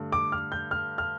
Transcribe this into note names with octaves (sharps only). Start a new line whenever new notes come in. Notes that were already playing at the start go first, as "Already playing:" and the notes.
Already playing: G2 D3 A3
D6
F6
G6
F6
F6